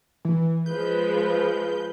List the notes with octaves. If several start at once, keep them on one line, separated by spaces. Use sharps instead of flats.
E3
F3 G#3 B4 G6